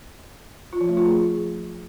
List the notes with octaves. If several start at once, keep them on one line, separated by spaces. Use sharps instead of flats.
F4
F3
A3
F4
G#4